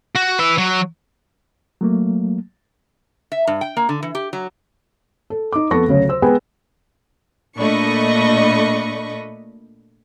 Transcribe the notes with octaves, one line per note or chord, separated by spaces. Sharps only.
F#4
B4 E5
F#3
F#3 A3 A#3
E5
G2
G5
A#3
D3
E3
G4
F#3
A4
D#4 D6
F2 B3 A4 C#6 A#6
D2 C#3 F#3
C5 E6
G#3 B3 G#4 B4 G5 G#5
A#2 A3 D4 D#5 B5 C#6